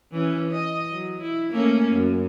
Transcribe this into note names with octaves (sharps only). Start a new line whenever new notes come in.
E3 C#4
D#5
F#3
E4
A3 A#3 C#4
F#2